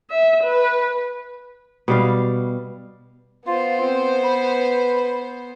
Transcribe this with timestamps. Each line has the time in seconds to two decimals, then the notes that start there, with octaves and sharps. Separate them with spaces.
0.10 E5
0.43 B4
1.88 B2 G3 F5
3.47 B3 F4 C5
3.80 C4
4.24 B4